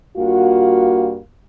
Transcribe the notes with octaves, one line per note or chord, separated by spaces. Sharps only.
G2 A#3 F4 F#4